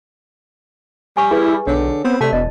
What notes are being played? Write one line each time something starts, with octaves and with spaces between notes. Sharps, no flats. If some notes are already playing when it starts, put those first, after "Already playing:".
G3 G#5 C#6
E4 G#4 B4
B1 D3 C#5
B3 C4
C3 A3 D5 A5
E1 B2 D#5